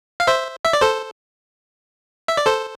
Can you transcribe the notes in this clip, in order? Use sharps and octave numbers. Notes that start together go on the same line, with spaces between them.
F5
C5 E5
E5
D5
A4 C5
E5
D5
A4 C5